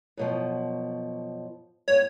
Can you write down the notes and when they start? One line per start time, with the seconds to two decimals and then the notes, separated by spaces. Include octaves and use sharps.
0.17 F#2 B2 F3
1.88 G2 B3 C#5